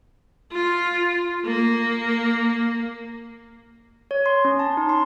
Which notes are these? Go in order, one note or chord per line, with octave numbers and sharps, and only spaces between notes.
F4
A#3
C#5
C6
C#4
A5
D#4
C6